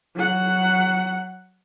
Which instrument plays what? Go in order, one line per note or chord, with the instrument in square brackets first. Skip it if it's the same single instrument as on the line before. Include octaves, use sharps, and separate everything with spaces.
[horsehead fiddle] F#3 F#5